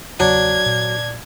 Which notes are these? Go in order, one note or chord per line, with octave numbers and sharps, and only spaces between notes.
E2 C#3 F#3 B3 D4 G#6
A#2